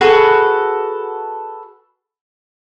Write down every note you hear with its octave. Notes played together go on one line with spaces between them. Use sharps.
F#4 G#4 A4 B4